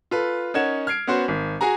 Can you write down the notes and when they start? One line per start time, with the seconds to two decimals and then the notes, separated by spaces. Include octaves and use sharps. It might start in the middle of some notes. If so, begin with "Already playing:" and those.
0.11 F4 A4 B4
0.54 C#4 D#4 A#4 F#5 G#6 E7
0.87 F6 G#6 C7 D7
1.07 B3 C#4 F#4 C5
1.28 G#1
1.61 F#4 G#4 G#5 A#5